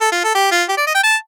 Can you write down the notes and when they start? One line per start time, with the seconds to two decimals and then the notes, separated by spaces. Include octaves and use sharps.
0.01 A4
0.12 F4
0.24 A4
0.35 G4
0.51 F4
0.69 G4
0.77 D5
0.87 D#5
0.95 G5
1.04 A5